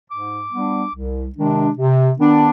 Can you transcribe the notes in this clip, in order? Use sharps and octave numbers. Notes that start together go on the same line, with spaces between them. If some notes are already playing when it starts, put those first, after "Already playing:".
G#2 D6
G3 B3 D4
C2
C3 D#3 G#3 D4
C3
D#3 B3 D4